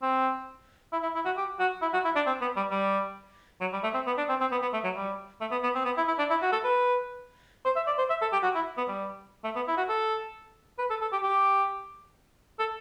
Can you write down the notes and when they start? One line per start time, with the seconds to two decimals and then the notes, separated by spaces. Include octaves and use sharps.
0.02 C4
0.93 E4
1.03 E4
1.15 E4
1.26 F#4
1.37 G4
1.60 F#4
1.82 E4
1.94 F#4
2.05 E4
2.16 D4
2.27 C4
2.41 B3
2.56 G3
2.71 G3
3.61 F#3
3.73 G3
3.84 A3
3.94 C4
4.07 B3
4.18 D4
4.29 C4
4.40 C4
4.52 B3
4.62 B3
4.74 A3
4.84 F#3
4.96 G3
5.41 A3
5.51 B3
5.63 B3
5.75 C4
5.85 B3
5.97 E4
6.08 E4
6.19 D4
6.30 E4
6.42 F#4
6.52 A4
6.64 B4
7.65 C5
7.76 E5
7.87 D5
7.98 C5
8.10 E5
8.22 A4
8.33 G4
8.43 F#4
8.55 E4
8.78 B3
8.88 G3
9.44 A3
9.56 B3
9.68 E4
9.78 F#4
9.89 A4
10.79 B4
10.90 A4
11.02 A4
11.12 G4
11.23 G4
12.59 A4